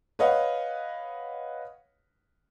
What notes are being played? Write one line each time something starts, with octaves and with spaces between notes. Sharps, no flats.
B4 C#5 D#5 F5 F#5